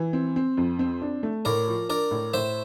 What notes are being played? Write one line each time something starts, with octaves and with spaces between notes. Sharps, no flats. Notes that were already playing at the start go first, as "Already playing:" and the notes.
Already playing: E3
C4
C4
F2
C4
D4
A3
A2 A#4 D5
F3
D4 A#4 D5
A2
A2 C5 E5